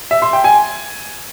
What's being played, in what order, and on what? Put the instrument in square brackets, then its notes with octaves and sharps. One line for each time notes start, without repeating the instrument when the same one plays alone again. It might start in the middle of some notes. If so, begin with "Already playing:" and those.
[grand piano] E5
C6
G5
G#5